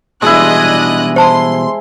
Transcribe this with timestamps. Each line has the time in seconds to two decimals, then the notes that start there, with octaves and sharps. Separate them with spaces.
0.22 B2 E3 G3 G#3 D4 E4 D#5 F#6
1.16 C5 A5 C6 E6